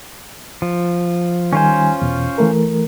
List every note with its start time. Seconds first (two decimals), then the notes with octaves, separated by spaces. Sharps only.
0.62 F3
1.53 D#3 G3 C#4 F4 C5 G#5
2.02 E2 B2
2.38 E3 A3 A#4